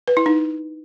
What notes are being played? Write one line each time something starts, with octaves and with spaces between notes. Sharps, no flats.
B4
E4
D#4